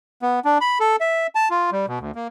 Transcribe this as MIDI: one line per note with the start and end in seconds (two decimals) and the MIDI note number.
0.22 0.40 59
0.45 0.58 62
0.61 0.78 83
0.80 0.96 69
1.00 1.27 76
1.35 1.49 81
1.50 1.70 65
1.72 1.86 55
1.88 1.99 47
2.00 2.11 38
2.15 2.28 58